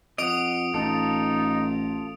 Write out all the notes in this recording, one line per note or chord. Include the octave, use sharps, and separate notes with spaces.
F2 D#5 F#5 D#6 D7 F7
A1 D#4 F4 A4